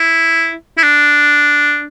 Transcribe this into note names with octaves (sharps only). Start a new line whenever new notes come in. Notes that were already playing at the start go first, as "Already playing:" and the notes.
Already playing: E4
E4
D4